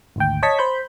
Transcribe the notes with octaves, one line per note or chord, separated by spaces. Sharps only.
G#1 D2 G5
C#5 D#5 A5 C#6 G#6 B6
C5 B5 G6